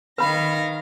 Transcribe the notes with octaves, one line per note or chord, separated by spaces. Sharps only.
D#3 B4 F5 B5 A#6